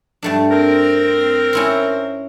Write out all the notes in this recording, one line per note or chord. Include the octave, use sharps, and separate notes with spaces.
G2 A3 D4
C4 A#4
C#4 E4 C5